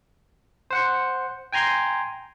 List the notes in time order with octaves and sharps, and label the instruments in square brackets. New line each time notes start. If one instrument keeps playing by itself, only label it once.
[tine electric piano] C5 F#5 C#7
G5 G#5 A#5 C6